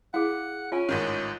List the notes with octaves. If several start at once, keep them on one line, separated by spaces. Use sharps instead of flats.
E4 G#4 F5 F#5
C#4 F4 E5 G#5
A1 G#2 D#3